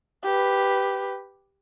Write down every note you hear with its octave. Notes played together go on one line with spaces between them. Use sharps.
G4 B4